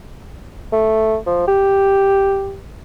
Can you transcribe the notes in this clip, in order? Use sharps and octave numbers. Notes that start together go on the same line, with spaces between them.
A3
F3
G4